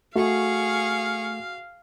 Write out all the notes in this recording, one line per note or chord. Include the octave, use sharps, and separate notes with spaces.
A3 F#4 G#4 F5 C#6